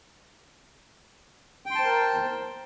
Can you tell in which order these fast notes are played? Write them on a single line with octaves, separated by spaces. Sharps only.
G5 C6 A5 C5 A#4